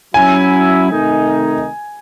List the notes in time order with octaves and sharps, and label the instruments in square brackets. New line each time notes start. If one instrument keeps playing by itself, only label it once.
[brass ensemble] F#3 C#4 E4 [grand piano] G#5
[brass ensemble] C3 D#3 A3 D#4